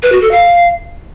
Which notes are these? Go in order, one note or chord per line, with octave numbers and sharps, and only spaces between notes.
B4
F#4
A4
F5